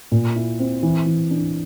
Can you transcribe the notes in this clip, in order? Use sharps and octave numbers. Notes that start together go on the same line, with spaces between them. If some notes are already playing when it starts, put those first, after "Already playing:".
A#2
E4
C4
E3
E3
D4